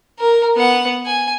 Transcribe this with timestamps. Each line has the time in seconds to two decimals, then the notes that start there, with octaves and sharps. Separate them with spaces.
0.19 A#4
0.56 B3 F#5
1.06 G#5